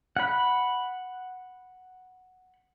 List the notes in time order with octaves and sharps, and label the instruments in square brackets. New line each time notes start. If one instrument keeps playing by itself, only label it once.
[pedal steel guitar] F#5 B5